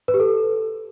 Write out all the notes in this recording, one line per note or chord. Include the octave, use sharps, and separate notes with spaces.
B4
G4
A4